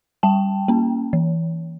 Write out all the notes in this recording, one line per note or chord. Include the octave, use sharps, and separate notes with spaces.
G3 G5 A5
A#3 C#4
E3